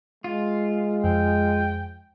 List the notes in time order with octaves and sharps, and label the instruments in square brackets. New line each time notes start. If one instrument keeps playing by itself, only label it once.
[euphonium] G#3 [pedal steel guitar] F4
[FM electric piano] F2 [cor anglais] G5